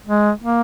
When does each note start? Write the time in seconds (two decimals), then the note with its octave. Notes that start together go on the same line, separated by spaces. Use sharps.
0.07 G#3
0.42 A#3